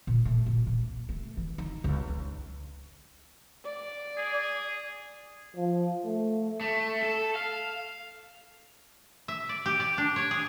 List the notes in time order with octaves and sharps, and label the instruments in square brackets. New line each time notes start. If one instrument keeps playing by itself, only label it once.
[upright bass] A#2
A3
A#2
A#3
A3
E3
D#4
C#2
D4
[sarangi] D5
[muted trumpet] G#4
[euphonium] F3
A3
[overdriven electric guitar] A3
A4
F5
[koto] E5
D5
G4
D5
D4
C#5
G#4